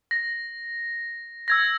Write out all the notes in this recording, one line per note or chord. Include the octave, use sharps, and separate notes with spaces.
A#6
E6 G#6 A#6